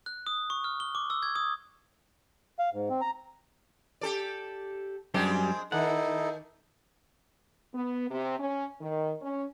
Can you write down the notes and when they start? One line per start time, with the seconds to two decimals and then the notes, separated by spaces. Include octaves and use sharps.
0.06 F#6
0.27 D#6
0.50 C#6
0.64 F6
0.80 G7
0.95 D6
1.10 E6
1.23 G#6
1.35 D#6
2.59 F5
2.73 G#2
2.89 C4
3.01 A#5
4.01 G4 A4 D5
5.14 F#2 G3 G#3 C4 D4 G4
5.72 D#3 D#4 E4 A4 F#5
7.75 B3
8.11 C3
8.40 C#4
8.81 D#3
9.22 C#4